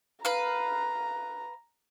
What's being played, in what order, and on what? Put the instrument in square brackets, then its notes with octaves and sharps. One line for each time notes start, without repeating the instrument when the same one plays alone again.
[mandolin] B4 F5 [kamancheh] A#5